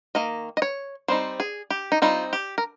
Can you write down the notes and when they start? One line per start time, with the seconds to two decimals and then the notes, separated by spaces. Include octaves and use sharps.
0.15 D#3 A#3 D#5
0.57 D#5
0.62 C#5
1.08 G3 C4 D#4 C5
1.40 G#4
1.70 G4
1.92 D#4
2.02 G3 C4 D#4 F4
2.33 G4
2.58 A#4